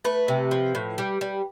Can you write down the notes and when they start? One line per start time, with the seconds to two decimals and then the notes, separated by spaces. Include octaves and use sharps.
0.04 A3 B4
0.28 C3
0.51 F3
0.75 A2
0.98 G3
1.21 G3